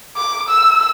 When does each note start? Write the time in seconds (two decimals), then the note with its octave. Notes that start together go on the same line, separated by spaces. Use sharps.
0.16 D6
0.48 E6